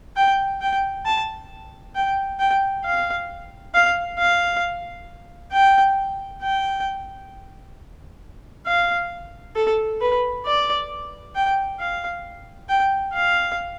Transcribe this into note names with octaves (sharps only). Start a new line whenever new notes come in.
G5
G5
A5
G5
G5
F5
F5
F5
G5
G5
F5
A4
B4
D5
G5
F5
G5
F5